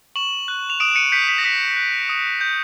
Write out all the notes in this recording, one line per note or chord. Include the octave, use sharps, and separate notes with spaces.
C#6 E7 F#7
F#6
F7
D#6 D7 E7
C#7 D#7
G6 B6 C#7
B6
A#6
D#6 B6
F#6
D#6
G6